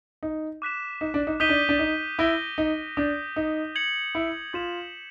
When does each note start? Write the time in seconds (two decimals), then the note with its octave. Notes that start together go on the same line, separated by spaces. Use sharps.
0.23 D#4
0.62 D6 F#6 B6 E7
1.01 D#4
1.14 D4
1.27 D#4
1.40 D#4 D#6 G6 B6 D#7 G7
1.49 D4
1.69 D4
1.79 D#4
2.19 E4 D#6 G6 A#6 D7 G7
2.58 D#4
2.97 D4 D#6 G6 A#6
3.36 D#4
3.75 G#6 C#7 F#7
4.15 E4
4.53 F4 D#6 G#6 B6 E7